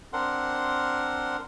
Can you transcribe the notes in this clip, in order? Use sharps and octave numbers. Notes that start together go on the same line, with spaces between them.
C4 D4 A#4 F#5 C6